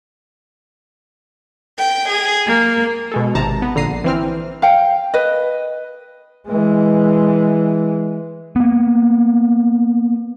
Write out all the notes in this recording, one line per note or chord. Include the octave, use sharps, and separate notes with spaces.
G5
G#4
A#3
B2 G#3 A4
G#1 C3 A5 A#5
B3
A#1 D3 A#5 C7 D#7
E3 C4 F6
F5 G5
B4 D#5
E3 G#3
A#3 B3